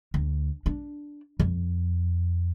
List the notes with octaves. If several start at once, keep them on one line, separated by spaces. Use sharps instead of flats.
D2
D4
F2